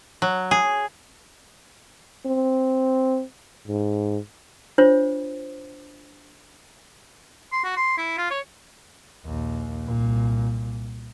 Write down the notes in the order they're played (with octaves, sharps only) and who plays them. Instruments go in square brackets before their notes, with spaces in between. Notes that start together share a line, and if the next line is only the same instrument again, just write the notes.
[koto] F#3
G#4
[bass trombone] C4
G#2
[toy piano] D4 F4 C5 C#5
[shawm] C6
F#4
C6
E4
F4
C#5
[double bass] A#1 D#2
C2 A#2